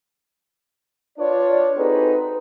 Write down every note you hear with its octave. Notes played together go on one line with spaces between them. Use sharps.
D4 F4 B4 C#5 D5
C4 D#4 F#4 G#4 A4 B4